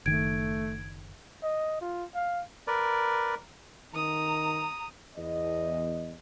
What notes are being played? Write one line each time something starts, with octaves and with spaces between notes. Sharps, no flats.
F#1 D#3 A3 G#6 D7
D#5
F4
F5
A#4 B4 D5
D#3 A#5 D#6
E2 D#5